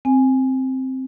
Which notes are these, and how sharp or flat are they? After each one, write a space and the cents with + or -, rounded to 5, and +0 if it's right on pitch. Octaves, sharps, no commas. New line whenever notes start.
C4 +0 G#5 +0